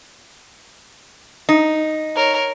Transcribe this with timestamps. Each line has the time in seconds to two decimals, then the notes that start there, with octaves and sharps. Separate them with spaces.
1.49 D#4
2.16 A#4 C#5